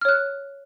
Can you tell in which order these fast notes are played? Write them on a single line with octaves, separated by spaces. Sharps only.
F6 C#5 F#6